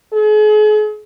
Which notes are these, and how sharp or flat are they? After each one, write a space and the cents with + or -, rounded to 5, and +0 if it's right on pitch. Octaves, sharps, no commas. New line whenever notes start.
G#4 +40